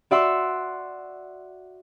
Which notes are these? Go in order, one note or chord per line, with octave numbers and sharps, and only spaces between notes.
F#4 D5 E5 F#5 C6 E6